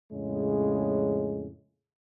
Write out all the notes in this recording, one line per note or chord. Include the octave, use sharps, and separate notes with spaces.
F2 A2 C#3 G#3